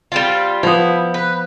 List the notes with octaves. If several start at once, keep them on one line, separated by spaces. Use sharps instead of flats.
G3 C4 F4
F3 B3 E4
B4